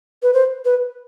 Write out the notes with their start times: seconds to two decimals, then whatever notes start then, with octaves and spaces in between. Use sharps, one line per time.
0.23 B4
0.34 C5
0.65 B4